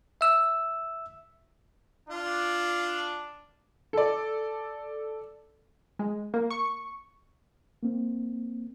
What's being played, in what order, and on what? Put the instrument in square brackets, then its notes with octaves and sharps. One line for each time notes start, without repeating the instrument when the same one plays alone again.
[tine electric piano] E5 E6
[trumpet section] D4 [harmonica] F4
[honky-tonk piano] A4 D5
[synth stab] G#3
A#3
C#6
[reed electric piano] A#3 C4